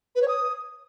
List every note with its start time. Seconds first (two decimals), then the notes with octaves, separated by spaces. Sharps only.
0.15 B4
0.22 C#5
0.28 D#6